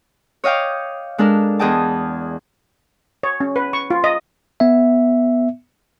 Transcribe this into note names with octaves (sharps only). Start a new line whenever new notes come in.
C#5 D#5 F5 G5 D6
G#3 D4 A4 A#4
E2 G#4 D#5 G5 A5
C#5
C#4
B4
C#6
F4
D#5
B3 E5